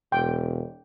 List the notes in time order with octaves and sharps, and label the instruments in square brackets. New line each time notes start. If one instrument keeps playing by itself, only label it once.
[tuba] E1 [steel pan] G5